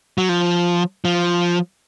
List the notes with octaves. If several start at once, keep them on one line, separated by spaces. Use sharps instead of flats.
F#3
F3
F3